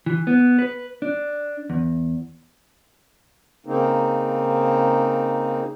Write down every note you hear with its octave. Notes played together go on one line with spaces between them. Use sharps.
E3
B3
B4
D4
E2
C#3 A#3 C4 D#4